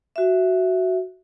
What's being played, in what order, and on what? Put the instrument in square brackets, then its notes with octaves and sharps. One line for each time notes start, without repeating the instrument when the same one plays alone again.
[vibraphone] F#4 E5